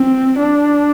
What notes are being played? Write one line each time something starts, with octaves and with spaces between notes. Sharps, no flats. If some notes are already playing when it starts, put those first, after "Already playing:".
Already playing: C4
D4